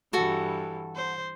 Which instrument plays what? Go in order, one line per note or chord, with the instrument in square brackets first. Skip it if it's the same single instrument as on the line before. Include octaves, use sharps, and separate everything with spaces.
[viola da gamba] G2 E3 [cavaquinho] F#4 A4
[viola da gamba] C5